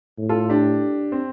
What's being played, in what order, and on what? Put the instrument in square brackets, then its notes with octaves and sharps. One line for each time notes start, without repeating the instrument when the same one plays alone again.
[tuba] A2
[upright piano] F4 A4
D4 G4
C4